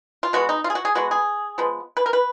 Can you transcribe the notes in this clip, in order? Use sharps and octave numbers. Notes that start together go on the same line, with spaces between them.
F4
B2 G#3 B3 F#4
D#4
F4
G#4
F#4
G#4
B2 G#3 B3 F#4
G#4
F3 G#3 B3
B4
A#4
B4